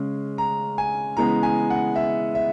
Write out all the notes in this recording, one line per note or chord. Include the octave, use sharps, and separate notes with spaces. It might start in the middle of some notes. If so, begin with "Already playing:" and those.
Already playing: C#3 G#3 C#4
A#5
G#5
C#3 E3 G#3 B3 A#5
G#5
F#5
E5
E5